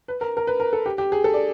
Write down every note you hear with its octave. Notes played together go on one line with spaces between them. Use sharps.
B4
A#4
A#4
B4
A#4
A4
G4
G4
G#4
A4
D5